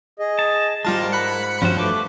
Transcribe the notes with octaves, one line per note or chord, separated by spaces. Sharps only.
G#4 D#5
A5
G#2 G3 G#3 F4 A#4 A5
B5 F#6 C#7
G2 F3 C#4 F#4
A3 B4 D6